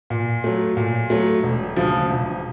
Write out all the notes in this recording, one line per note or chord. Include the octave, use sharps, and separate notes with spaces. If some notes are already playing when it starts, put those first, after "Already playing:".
A#2
F#3 A3
A#2
F#3 A3
E1
D2 C#3 F3
E1